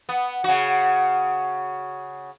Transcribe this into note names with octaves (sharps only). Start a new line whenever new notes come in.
B3
C#3 F#4